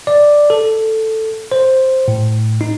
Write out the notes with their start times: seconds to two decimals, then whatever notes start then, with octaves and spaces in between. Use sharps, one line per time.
0.07 D5
0.50 A4
1.52 C5
2.08 A2
2.61 D#4